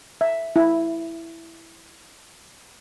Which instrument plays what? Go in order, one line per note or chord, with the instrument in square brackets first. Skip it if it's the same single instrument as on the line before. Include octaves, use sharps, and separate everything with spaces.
[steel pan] E5
E4